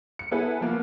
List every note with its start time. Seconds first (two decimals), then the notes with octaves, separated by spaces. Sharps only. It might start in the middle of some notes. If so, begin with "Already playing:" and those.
0.19 C#7
0.31 B3 E4 G#4 A4 B4
0.61 F3 A#3 B3